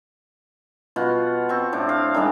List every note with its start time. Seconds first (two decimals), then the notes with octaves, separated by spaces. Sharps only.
0.96 B2 F4 F#4 F#5
1.49 C4 C#6
1.73 A2 D4 C5
1.89 F5
2.14 D#3 G3 G#3 D4